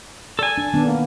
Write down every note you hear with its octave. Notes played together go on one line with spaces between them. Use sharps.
A4 D5 G#5
D4
D#3 B3 D4
A#3